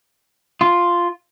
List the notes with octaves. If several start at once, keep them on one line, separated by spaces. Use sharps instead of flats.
F4